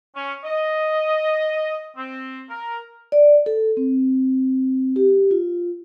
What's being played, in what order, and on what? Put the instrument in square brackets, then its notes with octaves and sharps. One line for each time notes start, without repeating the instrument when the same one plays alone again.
[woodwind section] C#4
D#5
C4
A#4
[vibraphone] D5
A4
C4
G4
F4